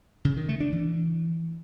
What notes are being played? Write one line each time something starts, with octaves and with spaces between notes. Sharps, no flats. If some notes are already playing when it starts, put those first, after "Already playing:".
C#3
D#3
A3
D4
E3